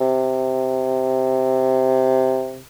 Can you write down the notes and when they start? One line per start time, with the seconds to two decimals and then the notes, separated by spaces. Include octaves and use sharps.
0.01 C3